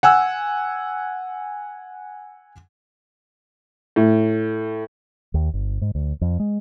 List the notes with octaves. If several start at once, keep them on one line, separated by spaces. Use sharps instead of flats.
F#5 G#5 E6
A2
D#2
G1
G#2
D2
F2
G#3